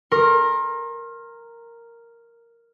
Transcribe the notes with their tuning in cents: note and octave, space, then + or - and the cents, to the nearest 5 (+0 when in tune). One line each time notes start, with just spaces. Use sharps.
A#4 -5 C6 +40